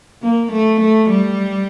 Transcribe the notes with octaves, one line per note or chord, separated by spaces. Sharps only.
A#3
A3
A3
G3